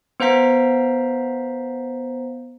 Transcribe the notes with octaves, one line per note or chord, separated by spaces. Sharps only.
B3 C5 F5 A#5 B6